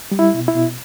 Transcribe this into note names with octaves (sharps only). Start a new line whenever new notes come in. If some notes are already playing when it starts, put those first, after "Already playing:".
G3
E4
B2
E4
B2